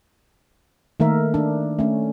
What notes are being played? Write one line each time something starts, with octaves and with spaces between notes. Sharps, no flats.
D#3 A3 A#3 A#4 E5
D4
A3 C#4